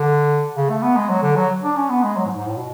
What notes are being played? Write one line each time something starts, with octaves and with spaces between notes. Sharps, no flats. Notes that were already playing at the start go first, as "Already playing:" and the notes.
Already playing: D3
C#3
A3
B3
G#3
F#3
D3
F#3
D4
C#4
B3
G#3
F#3
G#2
G#2
A2
B2